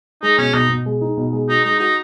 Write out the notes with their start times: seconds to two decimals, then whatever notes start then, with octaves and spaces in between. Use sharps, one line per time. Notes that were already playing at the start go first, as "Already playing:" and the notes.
0.23 G#3 D#4
0.38 B2 C#4
0.54 B2 D#4
0.70 B2
0.86 G#3
1.01 D#4
1.17 B2
1.33 G#3
1.49 D#4 F#4
1.65 G#3 D#4
1.80 D#4 F#4